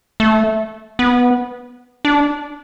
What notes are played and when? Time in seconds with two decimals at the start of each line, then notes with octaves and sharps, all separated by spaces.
0.20 A3
0.99 B3
2.05 D4